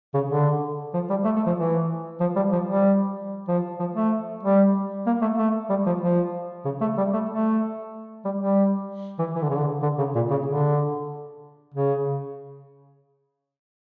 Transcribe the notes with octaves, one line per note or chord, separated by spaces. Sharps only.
C#3
D3
F3
G3
A3
A3
F3
E3
F3
G3
F3
G3
F3
F3
A3
G3
A#3
A3
A3
G3
F3
F3
C#3
A3
G3
A3
A3
G3
G3
E3
E3
D3
C#3
D3
D3
C#3
A#2
C#3
D3
C#3